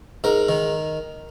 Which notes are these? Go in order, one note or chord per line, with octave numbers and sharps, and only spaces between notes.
G#2 A#4
D#3